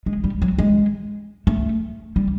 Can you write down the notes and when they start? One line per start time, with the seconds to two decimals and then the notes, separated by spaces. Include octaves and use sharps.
0.06 G#3
0.24 G3
0.42 F#3
0.58 G#3
1.47 A3
2.16 G3